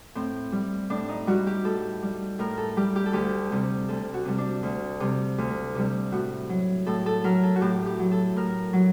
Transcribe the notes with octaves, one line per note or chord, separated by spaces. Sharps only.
A2 C4
G3
A2 D4
D#4
G3 F#4
G4
A2 A4
G3
A2 A#4
A4
G3 G4
G4
A4
D2 G4
C3 G3
D2 A4
F#4
C3 G3
D4
D2
C3 G3
D2
C3 G3
A2 F#4
F#3
A2 A4
A4
F#3 A#4
A4
F#4
A2 G4
G4
F#3
A4
A2 A#4
F#3